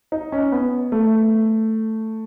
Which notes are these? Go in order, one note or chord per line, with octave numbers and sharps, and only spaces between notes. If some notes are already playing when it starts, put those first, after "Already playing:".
D#4
C#4
B3
A3